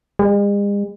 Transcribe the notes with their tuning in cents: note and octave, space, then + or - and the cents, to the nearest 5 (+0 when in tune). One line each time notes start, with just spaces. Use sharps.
G#3 -45